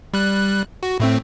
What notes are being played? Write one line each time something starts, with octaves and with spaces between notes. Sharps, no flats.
G3 F#6
F#4
A2 A3 C4